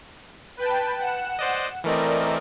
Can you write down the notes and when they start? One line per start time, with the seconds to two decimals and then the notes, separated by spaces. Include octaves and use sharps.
0.57 B4 G5 A5
1.00 F#5 E7
1.39 C5 D5 D#5
1.84 E3 A3 C4 A#4 D5 D#5